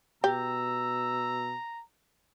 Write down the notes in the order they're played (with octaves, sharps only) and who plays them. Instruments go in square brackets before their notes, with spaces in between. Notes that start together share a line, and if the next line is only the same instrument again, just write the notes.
[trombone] B2 [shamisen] G4 [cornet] A#5 [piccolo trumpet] E6